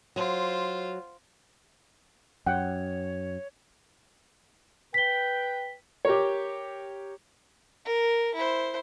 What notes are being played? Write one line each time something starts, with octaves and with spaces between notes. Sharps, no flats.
F#3 F4 C5
F#2 C#5 F#5 G5
B4 G5 B6 G7
G4 A#4 C#5
A#4
E4 C5